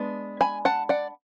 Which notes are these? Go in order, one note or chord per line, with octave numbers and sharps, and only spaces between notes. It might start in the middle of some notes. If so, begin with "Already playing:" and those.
Already playing: G#3 B3 D4
G#5 B5
F#5 A5
D5 F#5